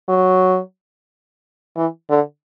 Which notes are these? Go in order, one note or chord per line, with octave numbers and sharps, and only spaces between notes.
F#3
E3
D3